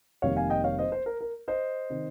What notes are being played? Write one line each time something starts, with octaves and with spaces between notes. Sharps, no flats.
F1 F2 D#3 G3 A#3 C#5 F5
F5 G#5
D#5 G5
C#5 F5
C5 D#5
C5
A#4
A#4
C5 D#5
C3 D#3